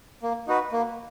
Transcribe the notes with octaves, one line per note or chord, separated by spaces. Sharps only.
A#3
D#4 F#4 B4
A#3